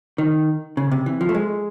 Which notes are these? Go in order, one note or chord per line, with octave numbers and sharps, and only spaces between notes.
D#3
C#3
C3
E3
F3
A3
G#3